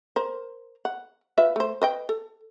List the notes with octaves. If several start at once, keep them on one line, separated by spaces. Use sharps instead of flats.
A#4 C5
F#5
F4 B4 E5
A3 C5
B4 D#5 G5
A4